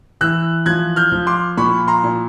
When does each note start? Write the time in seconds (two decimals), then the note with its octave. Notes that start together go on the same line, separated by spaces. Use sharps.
0.21 E3 E6 F#6
0.66 F3 F#6 G#6
0.96 F6 G6
1.12 F3
1.27 C6 D6
1.57 A#2 B5 C#6
1.88 A#5 C6
2.03 A#2